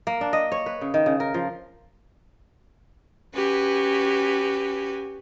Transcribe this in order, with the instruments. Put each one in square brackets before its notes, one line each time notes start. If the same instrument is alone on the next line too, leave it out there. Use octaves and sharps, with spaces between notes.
[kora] A#3
D4
D#5
C#5
B4
C#3
D#3
C#3
A#4
F3
[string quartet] C#4 F#4 G4 B4 G#5